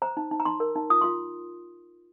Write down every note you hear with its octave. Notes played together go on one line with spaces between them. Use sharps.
C5 A#5
D#4
D#4
A#5
D#4 C6
A#4
D#4
F4 D#6
C6
F4